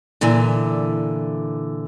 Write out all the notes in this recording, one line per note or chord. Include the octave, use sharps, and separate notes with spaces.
A#2 D3 E3